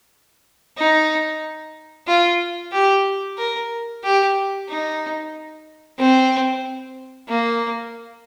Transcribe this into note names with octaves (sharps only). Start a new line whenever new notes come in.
D#4
F4
G4
A#4
G4
D#4
C4
A#3